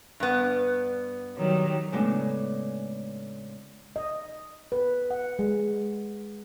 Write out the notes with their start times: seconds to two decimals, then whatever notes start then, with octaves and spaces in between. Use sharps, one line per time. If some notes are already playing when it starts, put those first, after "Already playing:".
0.20 G2 B3
1.37 D#3 F#3 G3
1.92 A2 C#3 G#3 A3 B3 D4
3.96 D#5
4.72 B4
5.11 F#5
5.39 G#3